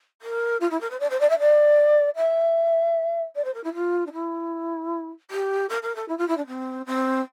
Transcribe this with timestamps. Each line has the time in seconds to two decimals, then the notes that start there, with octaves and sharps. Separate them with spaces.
0.22 A#4
0.60 F4
0.71 E4
0.81 A#4
0.90 C5
1.00 D5
1.10 C5
1.20 D5
1.29 E5
1.39 D5
2.17 E5
3.35 D5
3.44 C5
3.54 A#4
3.64 E4
3.74 F4
4.06 D4
4.13 E4
5.31 G4
5.69 A#4
5.82 A#4
5.95 A4
6.08 E4
6.18 F4
6.28 E4
6.37 D4
6.47 C4
6.86 C4